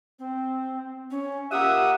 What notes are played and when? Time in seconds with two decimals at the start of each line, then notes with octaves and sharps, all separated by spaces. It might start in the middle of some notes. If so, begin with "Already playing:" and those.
0.19 C4
1.11 C#4
1.51 A#3 F4 G4 E5 F#5 D#6